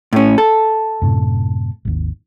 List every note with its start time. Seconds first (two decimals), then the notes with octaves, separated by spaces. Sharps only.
0.13 A2 C#4
0.38 A4
1.02 F#2 A2 C3
1.85 G#1 D#2